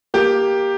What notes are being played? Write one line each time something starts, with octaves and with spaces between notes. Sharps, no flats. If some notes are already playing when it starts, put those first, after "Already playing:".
A#3 G4